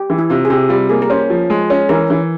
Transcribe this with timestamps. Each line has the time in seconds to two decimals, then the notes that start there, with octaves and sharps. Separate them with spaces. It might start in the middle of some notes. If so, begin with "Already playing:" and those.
Already playing: G4
0.10 E3
0.19 E4
0.30 C3 F4
0.45 G#4
0.50 C3 G4
0.69 G3 F4
0.89 A#3 G#4
1.02 A#4
1.10 C#4 C5
1.30 F3
1.50 G#3
1.70 C#4
1.89 E3 A#4
2.10 E3